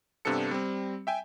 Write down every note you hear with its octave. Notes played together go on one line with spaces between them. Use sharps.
G2 C3 B3 D4 A4 C#7
G3 C4
E5 G5 G#5